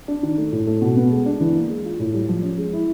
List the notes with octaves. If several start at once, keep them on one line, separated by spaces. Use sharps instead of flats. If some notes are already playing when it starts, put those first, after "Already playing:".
D4
D#3
A3
A2
A3
B2
B3
G#3
D4
E3
A#3
G#3
F4
A2
G3
F3
C#4
G#3
E4